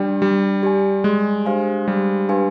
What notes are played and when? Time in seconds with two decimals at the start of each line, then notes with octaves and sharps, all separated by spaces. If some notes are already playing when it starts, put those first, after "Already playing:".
Already playing: G3 D4 G4 D5 G5
0.22 G3
0.63 G4 D5 G#5
1.04 G#3
1.45 D4 G4 C5 F5 G#5
1.88 G3
2.29 D4 G4 B4 F5 G#5